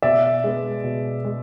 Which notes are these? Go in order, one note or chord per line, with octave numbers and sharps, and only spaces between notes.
B2 D5 E5
G#3 B3
B2
G#3